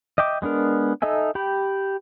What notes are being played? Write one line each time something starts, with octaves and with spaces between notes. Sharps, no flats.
D#5 E5 G5 D6
G#3 B3 D4 A#4
D#4 A4 D#5 E5 G#5
G4 G5 B5